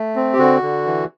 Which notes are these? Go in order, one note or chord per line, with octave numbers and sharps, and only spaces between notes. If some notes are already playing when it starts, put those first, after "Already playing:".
Already playing: A3
C4
G4
D3 F#4
D3
E3